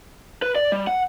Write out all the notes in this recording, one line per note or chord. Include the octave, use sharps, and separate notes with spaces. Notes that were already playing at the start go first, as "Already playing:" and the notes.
B4
D5
G3
F#5